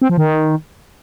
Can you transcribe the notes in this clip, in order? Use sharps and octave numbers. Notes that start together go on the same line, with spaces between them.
C4
F3
D#3